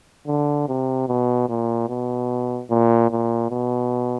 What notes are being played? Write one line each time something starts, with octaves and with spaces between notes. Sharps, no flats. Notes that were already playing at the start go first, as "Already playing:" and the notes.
D3
C3
B2
A#2
B2
A#2
A#2
B2